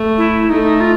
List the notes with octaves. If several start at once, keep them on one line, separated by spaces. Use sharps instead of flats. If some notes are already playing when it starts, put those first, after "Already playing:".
Already playing: A3
E4
A3 D#4
F4